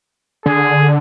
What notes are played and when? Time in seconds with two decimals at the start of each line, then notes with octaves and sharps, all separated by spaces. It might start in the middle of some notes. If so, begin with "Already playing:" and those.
0.46 D3 G#4